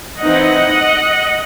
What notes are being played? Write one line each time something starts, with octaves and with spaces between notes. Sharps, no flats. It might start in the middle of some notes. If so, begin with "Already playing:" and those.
E3 C4 D#4 D#5 F#5